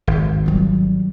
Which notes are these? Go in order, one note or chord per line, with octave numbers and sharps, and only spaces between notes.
G#1
F#3 G3